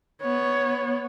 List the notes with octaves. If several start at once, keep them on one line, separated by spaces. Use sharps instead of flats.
B3 C#5